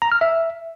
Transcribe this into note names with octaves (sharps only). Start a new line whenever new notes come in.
A#5
F6
E5